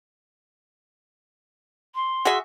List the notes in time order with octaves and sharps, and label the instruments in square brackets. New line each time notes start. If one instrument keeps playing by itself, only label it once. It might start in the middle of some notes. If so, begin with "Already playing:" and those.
[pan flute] C6
[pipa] F#4 G#4 E5